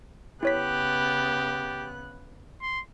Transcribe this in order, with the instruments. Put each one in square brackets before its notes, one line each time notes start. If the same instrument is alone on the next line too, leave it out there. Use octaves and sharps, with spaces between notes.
[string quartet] C#3 B3 F#6 [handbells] E4 C#5 B6 [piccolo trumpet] G4
[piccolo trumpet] C6